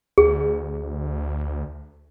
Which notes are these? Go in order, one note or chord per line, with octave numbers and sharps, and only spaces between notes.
D2 G#4